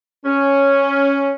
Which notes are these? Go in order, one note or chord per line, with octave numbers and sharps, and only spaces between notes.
C#4